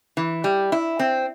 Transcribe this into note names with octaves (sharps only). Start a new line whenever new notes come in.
E3
G3
E4
C4